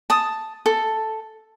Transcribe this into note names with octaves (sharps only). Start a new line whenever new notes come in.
A5 D#6
A4